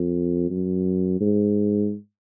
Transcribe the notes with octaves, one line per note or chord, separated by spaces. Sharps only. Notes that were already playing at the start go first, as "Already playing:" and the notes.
Already playing: F2
F#2
G#2